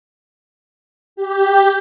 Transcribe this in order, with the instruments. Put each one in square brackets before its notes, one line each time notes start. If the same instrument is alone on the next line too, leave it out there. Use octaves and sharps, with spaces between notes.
[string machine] G4